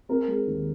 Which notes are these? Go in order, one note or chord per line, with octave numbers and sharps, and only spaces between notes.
C4 A#4
G#3
D#2